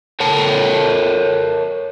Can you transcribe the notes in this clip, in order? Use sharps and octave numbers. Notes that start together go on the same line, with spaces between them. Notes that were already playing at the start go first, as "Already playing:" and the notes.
A4 A#4 C#5 A5